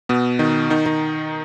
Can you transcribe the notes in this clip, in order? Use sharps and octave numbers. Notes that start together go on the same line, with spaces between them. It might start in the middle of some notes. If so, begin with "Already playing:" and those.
B2 B3
D#3 D#4
D#3 D#4
D#3 D#4